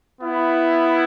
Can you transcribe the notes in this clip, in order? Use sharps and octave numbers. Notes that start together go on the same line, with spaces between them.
B3 E4